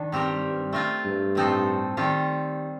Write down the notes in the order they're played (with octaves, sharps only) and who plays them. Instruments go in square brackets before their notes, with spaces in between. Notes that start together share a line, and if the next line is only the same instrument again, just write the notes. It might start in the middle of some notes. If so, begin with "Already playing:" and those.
Already playing: [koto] D#3 D4
[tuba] G2 [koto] G3 C4 G4 A#4
[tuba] G2
[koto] A3 C4 F4 A#4
[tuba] G2
[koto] A2 F3 C4 D#4 A4
D#3 G3 C4 F4